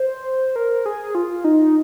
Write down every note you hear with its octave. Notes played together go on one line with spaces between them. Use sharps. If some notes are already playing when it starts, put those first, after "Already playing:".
Already playing: C5
A#4
G#4
F4
D#4